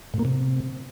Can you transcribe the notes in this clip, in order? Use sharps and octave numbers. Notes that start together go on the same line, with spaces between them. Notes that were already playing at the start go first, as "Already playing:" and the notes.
A2
A#3
C3